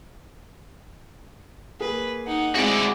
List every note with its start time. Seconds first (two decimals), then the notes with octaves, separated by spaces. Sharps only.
1.81 A#3 G#4 B4
2.27 D#4 F#5
2.56 G#3 C4 E4 F#4 G#4 D5